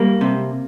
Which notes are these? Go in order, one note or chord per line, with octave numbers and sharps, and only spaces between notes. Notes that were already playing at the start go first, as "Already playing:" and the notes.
Already playing: G3 A#3
C3